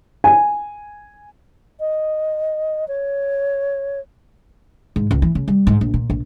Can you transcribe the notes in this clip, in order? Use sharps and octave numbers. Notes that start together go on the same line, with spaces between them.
G#5
D#5
C#5
G#2
C#2
E3
C#3
G3
G#2
A#1
A#2
A#1